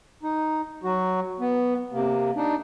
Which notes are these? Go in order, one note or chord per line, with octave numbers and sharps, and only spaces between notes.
D#4
F#3 F#4
B3
C3 A#3
D4 D#4